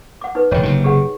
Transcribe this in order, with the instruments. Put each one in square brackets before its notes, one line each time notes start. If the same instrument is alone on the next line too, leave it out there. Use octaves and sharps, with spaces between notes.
[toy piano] F#5 D6
D#4 B4
[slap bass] E1 A2 C#3 [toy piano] C#5 D#5 G5
[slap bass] F#1 C3 [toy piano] D#4
[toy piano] G4 G#4 F#5